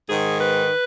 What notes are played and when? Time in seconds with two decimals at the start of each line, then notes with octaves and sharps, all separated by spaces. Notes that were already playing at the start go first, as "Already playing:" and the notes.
0.09 G#2 D#3 G#4
0.40 B4